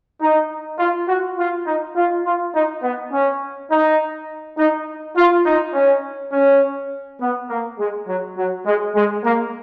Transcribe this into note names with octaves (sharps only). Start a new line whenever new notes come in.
D#4
F4
F#4
F4
D#4
F4
F4
D#4
B3
C#4
D#4
D#4
F4
D#4
C#4
C#4
B3
A#3
G#3
F#3
F#3
G#3
G#3
A#3